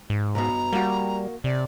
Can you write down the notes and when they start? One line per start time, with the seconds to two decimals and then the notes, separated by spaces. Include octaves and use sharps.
0.10 G#2
0.35 B1 G2 B2 A#5
0.73 G3 A#3 F#4
1.44 C3 D5